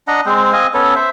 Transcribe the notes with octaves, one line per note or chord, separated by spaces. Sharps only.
D4 D#5 F#5 A#5
G#3 C4 C5
C4 D#5 F5 G#5
B3 C#4 A4 C#5
C5 E5